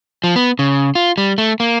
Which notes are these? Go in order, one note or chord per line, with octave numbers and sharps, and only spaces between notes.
F3
B3
C#3
F4
G3
A3
A#3